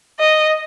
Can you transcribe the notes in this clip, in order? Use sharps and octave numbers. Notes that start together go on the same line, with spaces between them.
D#5